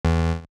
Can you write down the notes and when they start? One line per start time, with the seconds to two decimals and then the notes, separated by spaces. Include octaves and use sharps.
0.05 E2